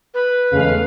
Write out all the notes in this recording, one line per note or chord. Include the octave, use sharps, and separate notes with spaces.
B4
E2 C#3 G#3 A3 F5